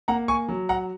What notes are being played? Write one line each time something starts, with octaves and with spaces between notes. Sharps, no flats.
A#3 F#5 A#5
G#5 C#6
F#3
F#5 A#5